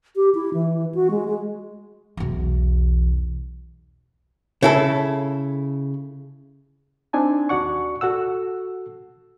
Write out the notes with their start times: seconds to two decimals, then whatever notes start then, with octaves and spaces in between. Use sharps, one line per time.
0.16 G4
0.35 E4
0.54 E3
0.95 F#4
1.11 G#3
1.27 G#3
2.17 B1 E2
4.62 C#3 E4 A4
7.13 C4 D4 D#4 G#5 A5
7.49 D#2 F#4 D5 F#5 C#6
8.01 F#4 A4 F#5 E6